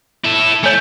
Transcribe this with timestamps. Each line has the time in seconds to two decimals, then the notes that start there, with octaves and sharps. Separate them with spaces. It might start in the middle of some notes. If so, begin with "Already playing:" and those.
0.24 E4 A4
0.63 A3 C#5 G#5